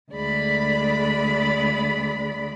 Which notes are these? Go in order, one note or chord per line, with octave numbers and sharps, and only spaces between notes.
D2 G#3 D5 B5